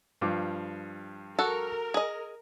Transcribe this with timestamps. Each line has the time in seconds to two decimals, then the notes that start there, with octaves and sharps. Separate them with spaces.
0.21 G2 F3 D6
1.39 F#4 A4 A#4
1.94 G#4 D#5